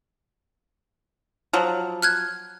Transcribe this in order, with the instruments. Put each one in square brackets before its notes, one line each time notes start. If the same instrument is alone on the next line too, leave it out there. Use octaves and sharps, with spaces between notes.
[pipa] F3 F#3
[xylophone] F6 F#6 G#6